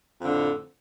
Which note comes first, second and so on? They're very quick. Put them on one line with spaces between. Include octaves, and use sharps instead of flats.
F2 D3 A2